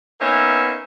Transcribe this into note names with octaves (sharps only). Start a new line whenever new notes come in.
A#3 B3 C#4 D#4 E5